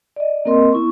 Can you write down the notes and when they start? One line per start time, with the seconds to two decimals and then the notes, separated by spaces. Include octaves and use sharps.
0.16 D5 D#5
0.45 A#3 C4 A#4 D#5 C6
0.73 B3 E4 C#6